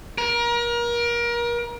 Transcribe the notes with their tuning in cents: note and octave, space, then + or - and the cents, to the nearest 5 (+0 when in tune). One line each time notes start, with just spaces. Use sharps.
A#4 +30